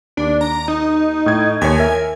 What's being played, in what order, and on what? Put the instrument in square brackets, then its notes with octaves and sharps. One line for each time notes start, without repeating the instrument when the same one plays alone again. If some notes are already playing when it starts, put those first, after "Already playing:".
[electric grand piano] D#2 [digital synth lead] D4
[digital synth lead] A#5
D#4
[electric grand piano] A2 G#6
[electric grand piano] D#2 C#5 [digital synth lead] G#5
[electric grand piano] A#4 E5